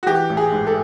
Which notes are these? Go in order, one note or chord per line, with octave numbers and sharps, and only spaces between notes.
F#4
E3 G4
A1
G#4
G#2
A4